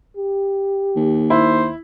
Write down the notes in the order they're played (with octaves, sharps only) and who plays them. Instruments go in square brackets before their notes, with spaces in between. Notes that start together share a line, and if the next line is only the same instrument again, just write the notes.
[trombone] G4
[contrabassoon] D#2
[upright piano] E4 [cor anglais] C5